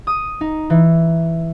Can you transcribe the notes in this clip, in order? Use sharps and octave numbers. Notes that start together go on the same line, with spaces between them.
D#6
D#4
E3